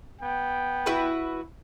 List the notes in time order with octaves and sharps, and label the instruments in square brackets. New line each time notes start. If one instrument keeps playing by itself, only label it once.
[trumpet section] B3 G5
[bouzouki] E4 F#4 B4